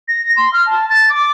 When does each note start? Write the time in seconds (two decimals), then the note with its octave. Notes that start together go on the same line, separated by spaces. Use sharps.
0.08 A#6
0.37 C6
0.53 F6
0.66 A5
0.90 A6
1.10 D6